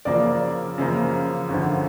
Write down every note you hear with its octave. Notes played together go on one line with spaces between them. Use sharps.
F#2 C#3 F3 A#3 D5 D6
F#2 C#3 F3 A#3
G#1 F#2 D3 F3